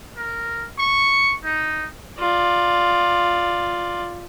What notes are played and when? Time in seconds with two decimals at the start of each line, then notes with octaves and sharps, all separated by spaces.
0.17 A#4
0.79 C#6
1.44 D#4
2.19 F4 D5